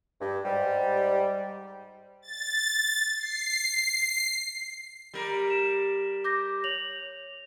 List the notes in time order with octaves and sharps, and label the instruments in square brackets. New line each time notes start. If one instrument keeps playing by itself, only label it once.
[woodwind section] G2
G#2 G3
[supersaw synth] A6
C7
[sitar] G3 A#4
[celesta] E7
D6 G6 A#6
C#5 F7 F#7